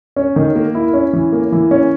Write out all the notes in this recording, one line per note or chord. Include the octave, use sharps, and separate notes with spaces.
C#4
D#3
A#3
E4
C#4
E3
A#3
E3
C#4